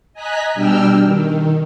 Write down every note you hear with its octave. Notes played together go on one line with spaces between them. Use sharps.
D#5 G#5 A#5 F#6 B6
B2 G3 D4 G5 E6 F6
D#3